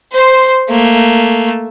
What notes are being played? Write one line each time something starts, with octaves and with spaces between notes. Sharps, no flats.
C5 C6
A3 A#3